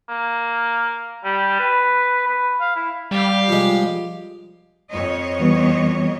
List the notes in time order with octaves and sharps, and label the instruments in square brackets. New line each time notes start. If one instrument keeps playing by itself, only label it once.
[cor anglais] A#3
G3
B4
B4
F5
E4
[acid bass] G3 [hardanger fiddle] G4 F5
[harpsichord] F3 G#3 [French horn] F4
[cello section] F2 C#5 D#5
[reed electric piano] E3 G3 B3